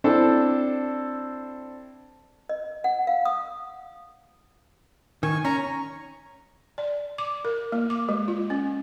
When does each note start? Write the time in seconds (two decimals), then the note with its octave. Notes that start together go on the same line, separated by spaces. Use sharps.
0.04 C4 D4 E4 A4
2.49 D#5
2.84 F#5
3.07 F5
3.25 D#6
5.23 D#3 G#5 C#6
5.45 C#4 A#5 C#6
6.78 D5
7.18 D6
7.45 A#4
7.72 A#3
7.90 D6
8.09 G#3
8.28 F4
8.50 C#4